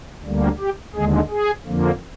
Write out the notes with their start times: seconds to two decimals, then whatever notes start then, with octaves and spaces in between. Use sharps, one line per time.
0.23 D2 D3 G3 A#3
0.59 G4
0.94 D#2 D3 G#3 G#4
1.30 G#4
1.66 F2 D3 F3 A#3